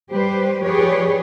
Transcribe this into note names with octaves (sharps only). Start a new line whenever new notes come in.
G3 G4 B4 C5
F3 G4 G#4 B4 C#5 D5